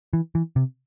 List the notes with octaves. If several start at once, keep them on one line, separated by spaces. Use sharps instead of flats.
E3
E3
C3